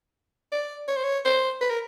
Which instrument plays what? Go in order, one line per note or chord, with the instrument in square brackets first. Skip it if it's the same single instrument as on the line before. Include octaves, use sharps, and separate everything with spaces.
[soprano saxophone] D5
C#5
C5
C#5
C5
B4
A#4